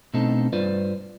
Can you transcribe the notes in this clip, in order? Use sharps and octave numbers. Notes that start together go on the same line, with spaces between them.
B2 A3 C4 D4 D#4 A4
G2 F4 B4 C5 D5